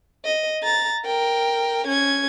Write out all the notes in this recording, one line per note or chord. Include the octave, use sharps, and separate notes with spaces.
D#5
A#5 A6
A#4 G5
C#4 G#6